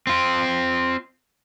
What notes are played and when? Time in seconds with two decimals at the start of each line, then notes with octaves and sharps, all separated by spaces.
0.07 C4 F4